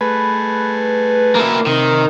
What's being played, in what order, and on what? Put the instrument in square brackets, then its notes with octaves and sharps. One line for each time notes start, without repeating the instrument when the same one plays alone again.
[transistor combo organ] A3 G#4 [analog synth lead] B4
[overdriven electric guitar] A#3 E4
[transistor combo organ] C3 [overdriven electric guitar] D#3